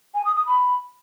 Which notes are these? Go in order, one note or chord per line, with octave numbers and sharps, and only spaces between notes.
G#5
D#6
D#6
B5